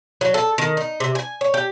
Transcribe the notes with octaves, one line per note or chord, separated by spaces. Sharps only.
F#3
A4
D#3
D#4
C3
G#5
C#5
G4